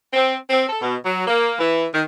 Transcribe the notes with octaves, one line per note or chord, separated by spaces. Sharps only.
C4
C4
A4
B2
F#3
A#3
E3
D#3